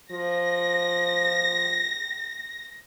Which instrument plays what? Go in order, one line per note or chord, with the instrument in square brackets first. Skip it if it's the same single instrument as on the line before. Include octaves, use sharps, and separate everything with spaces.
[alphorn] F3 [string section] A#6